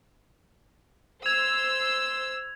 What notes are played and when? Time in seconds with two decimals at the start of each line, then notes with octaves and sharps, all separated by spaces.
1.26 C5 E6 G#6 F7